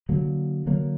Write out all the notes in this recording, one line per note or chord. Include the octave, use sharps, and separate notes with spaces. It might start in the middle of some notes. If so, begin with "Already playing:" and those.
D3 F#3 A#3
D3 F#3 A#3